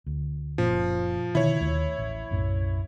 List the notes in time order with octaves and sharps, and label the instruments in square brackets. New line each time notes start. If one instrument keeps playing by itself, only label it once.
[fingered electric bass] D2
[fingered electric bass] F#1 A#2 C#4 [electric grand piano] F3
[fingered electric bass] B2 D3 D#3 [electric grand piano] E4 C#5
[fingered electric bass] D#2 D#3 A3
A1
B1 F#2 A2